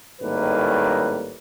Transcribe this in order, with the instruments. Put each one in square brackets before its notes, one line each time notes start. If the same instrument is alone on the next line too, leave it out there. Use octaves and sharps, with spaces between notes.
[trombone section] G#1 A2 D#3 G3 A#3 B4